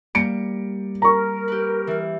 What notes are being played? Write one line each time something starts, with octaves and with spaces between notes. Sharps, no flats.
G3 A#3 C#7 D7
A#4 A#5 C#6
G4 B4
E3